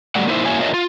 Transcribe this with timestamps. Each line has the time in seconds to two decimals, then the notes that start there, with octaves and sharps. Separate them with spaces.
0.15 F#3 G3 A3 D5 F#5
0.28 A#3 D#4 E4 C5 E5
0.45 A#3 E4 F#4 C#5 E5 G#5
0.60 D4 F4 A#4 C#5 D#5 E5
0.74 F4